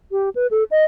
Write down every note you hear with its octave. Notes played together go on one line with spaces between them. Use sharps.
G4
B4
A4
D#5